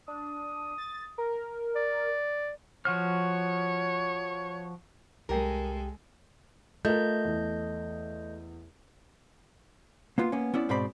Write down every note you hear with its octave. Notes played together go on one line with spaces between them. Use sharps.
D4 D#6
A6
A#4
D5
F3 F#4 C#5 F6
C2 G#3 G4 A4 A#4 G5 G#5
A3 F4 A#4 D#5 G6
E2
A#3 B3 F4
A#3 B3 C#4
B3 C#4 E4 D5
G#2 B2 C4 C5 D5 B5